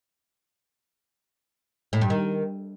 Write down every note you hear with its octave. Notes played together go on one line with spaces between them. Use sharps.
A2
G2
D#3